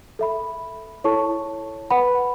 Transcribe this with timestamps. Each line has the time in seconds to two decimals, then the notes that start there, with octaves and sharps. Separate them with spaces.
0.19 A4 E5 B5
1.04 E4 A4 C#5 A5 C#6
1.90 B4 F#5 B5